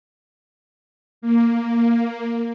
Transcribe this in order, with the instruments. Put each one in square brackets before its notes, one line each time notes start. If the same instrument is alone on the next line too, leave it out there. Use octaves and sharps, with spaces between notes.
[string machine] A#3